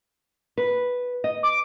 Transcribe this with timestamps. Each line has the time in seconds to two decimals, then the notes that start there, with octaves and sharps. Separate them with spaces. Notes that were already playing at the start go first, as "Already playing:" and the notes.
0.57 B4
1.24 D#5
1.43 D6